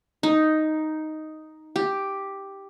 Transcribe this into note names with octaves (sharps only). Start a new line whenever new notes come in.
D#4
G4